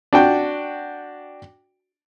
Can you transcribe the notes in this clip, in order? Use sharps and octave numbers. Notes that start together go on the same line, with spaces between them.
D4 F#4 G5